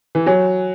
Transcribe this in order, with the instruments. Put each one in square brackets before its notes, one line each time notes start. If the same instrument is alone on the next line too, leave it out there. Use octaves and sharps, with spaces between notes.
[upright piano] E3
[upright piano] F#3 [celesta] C#5 G#5